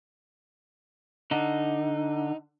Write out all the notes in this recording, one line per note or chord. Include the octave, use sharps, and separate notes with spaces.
D3 D#4